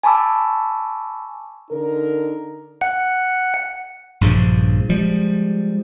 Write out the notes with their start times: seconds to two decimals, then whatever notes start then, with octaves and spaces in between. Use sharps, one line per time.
0.03 G#5 A5 B5 C#6 D6 E6
1.71 D3 D#4 A#4
2.81 F#5
4.21 A#1 G2 C#3 F3
4.89 F3 G3 G#3